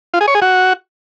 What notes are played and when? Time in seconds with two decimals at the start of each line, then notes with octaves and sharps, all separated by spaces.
0.14 F4
0.21 G#4
0.28 C#5
0.35 G#4
0.42 F#4